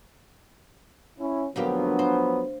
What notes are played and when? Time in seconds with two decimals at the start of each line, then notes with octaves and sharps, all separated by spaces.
1.19 C#4 E4
1.56 D2 F3 F#3 A#3 B3 G4
1.99 C5